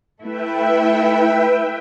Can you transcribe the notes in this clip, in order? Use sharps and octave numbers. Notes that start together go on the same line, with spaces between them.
A3 E4 B4 E5 G5